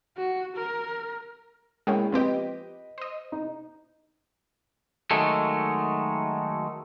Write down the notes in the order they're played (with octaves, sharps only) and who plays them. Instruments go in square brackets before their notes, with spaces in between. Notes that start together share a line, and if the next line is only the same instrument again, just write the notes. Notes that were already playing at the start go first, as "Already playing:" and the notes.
[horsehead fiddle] F#4
A#4
[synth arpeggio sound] G#3 A#3 C#4 [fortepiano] E4 G5
[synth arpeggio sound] F3 C4 G4 [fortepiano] B4 D#5
[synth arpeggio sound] C5 D#5
[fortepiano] D#4
[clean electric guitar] D#3 F#3 G#3 A3